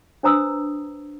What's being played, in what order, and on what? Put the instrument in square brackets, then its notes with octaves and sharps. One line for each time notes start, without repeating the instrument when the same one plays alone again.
[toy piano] D4 B4 C5 A#5 D#6 E6